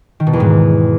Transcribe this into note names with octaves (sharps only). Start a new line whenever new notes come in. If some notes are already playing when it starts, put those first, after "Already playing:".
D#3
B2
E2
G#2